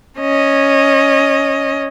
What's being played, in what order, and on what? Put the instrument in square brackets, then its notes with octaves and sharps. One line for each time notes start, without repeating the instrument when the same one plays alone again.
[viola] C#4 D#5